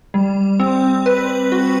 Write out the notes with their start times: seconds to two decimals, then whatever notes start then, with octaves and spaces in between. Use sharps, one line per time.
0.14 G3
0.60 C4
1.06 B4
1.52 F#4